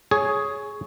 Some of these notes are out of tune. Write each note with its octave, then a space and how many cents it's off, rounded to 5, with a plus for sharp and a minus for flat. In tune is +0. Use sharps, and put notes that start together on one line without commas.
G#4 +10 C#5 +0